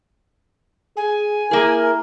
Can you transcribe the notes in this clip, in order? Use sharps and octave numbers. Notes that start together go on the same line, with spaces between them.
G#4 G#5
A#3 E4 G#4 A#4